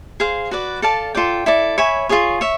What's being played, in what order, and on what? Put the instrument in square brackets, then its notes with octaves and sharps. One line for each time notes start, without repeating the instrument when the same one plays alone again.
[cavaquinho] G#4 C5 F5
F#4 B4 D5
A4 D5 F5 A5
F4 A4 D5 G5
E4 A4 D5
C#5 E5 G#5 B5
F4 G#4 C#5
C#5 E5